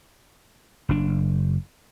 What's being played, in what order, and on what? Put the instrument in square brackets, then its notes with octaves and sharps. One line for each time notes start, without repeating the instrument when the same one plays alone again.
[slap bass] F#1 D4